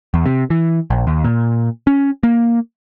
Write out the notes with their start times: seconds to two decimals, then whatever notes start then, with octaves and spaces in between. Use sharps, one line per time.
0.14 E2
0.26 C3
0.50 E3
0.90 A#1
1.07 D#2
1.24 A#2
1.87 C#4
2.23 A#3